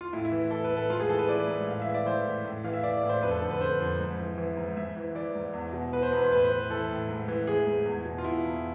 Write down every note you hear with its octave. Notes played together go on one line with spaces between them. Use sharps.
F4
A2 E4
E4
E3
E3 A4
B4
A2
A4
G#2 F4
G#4
E3 A4
B4
E3 D5
G#2
A2 F5
E5
E3
D5
E3 C5
A2
A2
E3 F5
E5
E3 D5
D5
A2
C5
F2 B4
A4
D3 A4
B4
D3 C5
F2
G#2
E3
E3
G#2
G#2 E5
E3
E3 D5
G#2
E2
B2
B2 B4
C5
E2 B4
C5
A2 B4
C5
E3 B4
E3 A4
A2
G#2
E3
E3 G#4
G#2
E2
B2
F4
B2 E4
E2